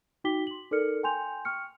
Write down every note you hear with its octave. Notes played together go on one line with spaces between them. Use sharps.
D#4 F#4 G5 D6 B6 G7
C6 F#7
D#4 A4 A#4 D5 F6 C#7
G5 G#5 C6 G6 F7
G5 C#6 F6 C#7